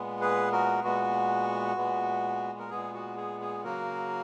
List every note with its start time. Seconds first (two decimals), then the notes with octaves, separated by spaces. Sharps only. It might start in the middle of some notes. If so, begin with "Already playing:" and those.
Already playing: A#2 G#3 B3
0.21 G#4 B4
0.52 F#4 A#4
0.84 A#2 G#3 B3 F#4
1.77 A#2 G#3 B3
2.59 A#4
2.70 A#2 G#3 B3 G#4
2.94 F#4
3.17 G#4
3.41 G#4
3.64 C#3 F#3 A#3 F#4 A#4